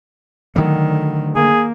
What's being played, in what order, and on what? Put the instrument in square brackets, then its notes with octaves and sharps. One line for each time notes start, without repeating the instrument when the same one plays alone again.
[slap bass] D3 F#3 A3 [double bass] D#3
[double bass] A#3 [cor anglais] G#4